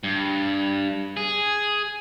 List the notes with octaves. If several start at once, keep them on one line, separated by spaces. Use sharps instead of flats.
G2
G#4